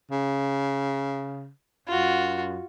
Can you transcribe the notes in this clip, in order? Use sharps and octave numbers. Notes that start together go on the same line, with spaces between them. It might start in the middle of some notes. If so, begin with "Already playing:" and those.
C#3
F#2 F4 F#4